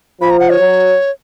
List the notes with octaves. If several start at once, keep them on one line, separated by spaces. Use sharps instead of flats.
F3 B5
A#5
F#5
C#5
F#3